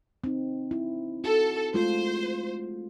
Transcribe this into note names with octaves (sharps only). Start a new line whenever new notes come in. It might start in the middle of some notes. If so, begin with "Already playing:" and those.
C4 D#4
E4
F#4 A4
G#3 A3 F4 C5